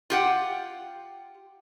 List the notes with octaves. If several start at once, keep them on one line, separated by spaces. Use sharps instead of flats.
F4 G4 F#5